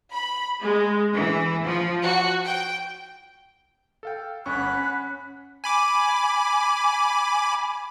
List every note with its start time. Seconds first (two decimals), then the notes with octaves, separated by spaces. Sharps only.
0.11 B5
0.62 G#3
1.14 E3
1.66 F3
2.03 F#4
2.45 G5
4.03 A4 F5 G5
4.46 G1 C#4 F#5 B5 C#6 F#6
4.66 C#4
5.64 G#5 B5 D6